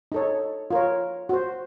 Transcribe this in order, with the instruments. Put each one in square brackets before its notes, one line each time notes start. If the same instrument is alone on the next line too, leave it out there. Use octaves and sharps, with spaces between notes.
[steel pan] D#4 A4 C#5
F4 A#4 C#5
F#4 C5